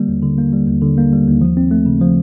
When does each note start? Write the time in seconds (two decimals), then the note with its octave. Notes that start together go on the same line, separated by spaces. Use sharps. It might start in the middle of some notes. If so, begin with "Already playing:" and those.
Already playing: D3 G3 A#3
0.08 D#2
0.22 D3
0.38 A#3
0.53 G3
0.67 D#2
0.82 D3
0.98 A#3
1.13 G3
1.27 D#2
1.41 F3
1.57 C4
1.71 A3
1.86 C#3
2.01 F3